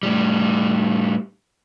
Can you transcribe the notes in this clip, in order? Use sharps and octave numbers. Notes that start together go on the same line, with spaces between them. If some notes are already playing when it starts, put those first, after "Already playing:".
A2 G3